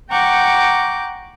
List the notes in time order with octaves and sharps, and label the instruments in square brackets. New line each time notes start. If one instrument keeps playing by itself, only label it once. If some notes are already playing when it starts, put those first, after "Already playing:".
[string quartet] F#5 G5 A#5 C#6 D6 G6